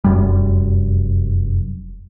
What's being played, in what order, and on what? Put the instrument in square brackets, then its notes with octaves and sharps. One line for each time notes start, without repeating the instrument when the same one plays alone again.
[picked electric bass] F1 F#2 G3